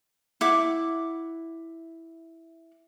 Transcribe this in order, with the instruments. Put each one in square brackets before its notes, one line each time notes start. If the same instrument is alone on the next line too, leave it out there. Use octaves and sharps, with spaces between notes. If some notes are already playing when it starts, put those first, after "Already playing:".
[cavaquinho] E4 F#5 D6